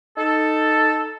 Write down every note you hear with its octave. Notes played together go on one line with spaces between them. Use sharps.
D#4 A4